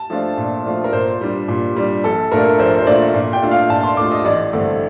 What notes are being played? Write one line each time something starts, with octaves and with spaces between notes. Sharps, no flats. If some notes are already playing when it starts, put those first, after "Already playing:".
Already playing: A5
F3 A3 D4 F4
A#2
F3 A3 D4 F4
A#4
A#2 C5
G3 D4
A#2
G3 D4
A#1 A4
A#2 A3 D4 F4 A#4
A#1 C5
C5
A#2 A3 D4 F4 D5
A#2
G5
A3 D4 F4
F5
A#2 A5
C6
A3 D4 F4 D6
D#5
A1 D5
G2 D3 A3 C4